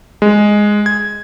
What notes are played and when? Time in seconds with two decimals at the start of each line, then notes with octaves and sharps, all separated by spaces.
0.22 G#3
0.86 G#6